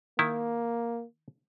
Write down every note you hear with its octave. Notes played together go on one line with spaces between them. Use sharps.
D#3 A#3 E4